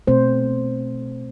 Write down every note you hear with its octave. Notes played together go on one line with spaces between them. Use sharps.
B2 A3 C4 C5